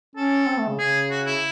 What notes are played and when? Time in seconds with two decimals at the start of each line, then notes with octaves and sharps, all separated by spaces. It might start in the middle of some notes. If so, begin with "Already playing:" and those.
0.16 C#4 A4
0.47 C4
0.58 A3
0.68 C#3
0.79 C#3 G#4
1.11 F#4
1.27 E4